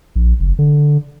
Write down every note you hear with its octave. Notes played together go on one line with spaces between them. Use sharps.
A#1
F#1
D3